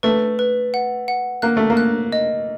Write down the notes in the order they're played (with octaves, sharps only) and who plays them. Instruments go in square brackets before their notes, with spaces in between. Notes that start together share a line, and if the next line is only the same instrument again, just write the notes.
[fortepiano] A3 [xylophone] B4
[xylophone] B4
F#5
F#5
[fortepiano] A#3 [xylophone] F#6
[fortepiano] A3
A#3
[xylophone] F#6
D#5